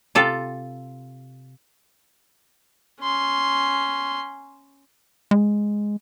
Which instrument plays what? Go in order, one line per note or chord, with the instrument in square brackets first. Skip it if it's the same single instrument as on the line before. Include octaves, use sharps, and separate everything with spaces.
[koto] C3 F4 A4
[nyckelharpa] C#4 C6
[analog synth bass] G#3